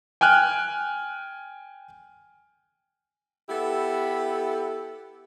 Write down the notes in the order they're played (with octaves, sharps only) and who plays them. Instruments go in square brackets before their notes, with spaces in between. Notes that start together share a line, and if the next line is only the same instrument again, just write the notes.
[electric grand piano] G5 G#5 F6 F#6
[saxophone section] B3 E4 G4 A4